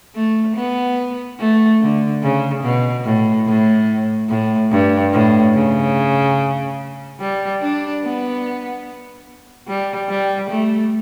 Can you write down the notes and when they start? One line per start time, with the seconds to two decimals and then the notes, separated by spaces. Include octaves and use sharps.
0.15 A3
0.56 B3
1.40 A3
1.81 D3
2.23 C#3
2.64 B2
3.05 A2
3.47 A2
4.29 A2
4.72 G2
5.13 A2
5.54 C#3
7.20 G3
7.61 D4
8.02 B3
9.68 G3
10.09 G3
10.50 A3